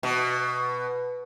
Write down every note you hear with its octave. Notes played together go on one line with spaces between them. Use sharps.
B2